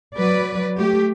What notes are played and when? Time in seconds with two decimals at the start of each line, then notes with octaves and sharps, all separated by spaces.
0.15 F#3 B4 D5
0.77 A3 G4